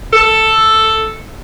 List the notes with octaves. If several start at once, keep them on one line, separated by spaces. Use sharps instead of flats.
A4